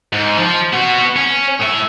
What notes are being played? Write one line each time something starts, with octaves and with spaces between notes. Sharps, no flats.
G#2
F3
B3 F#4
C#4
A2 E5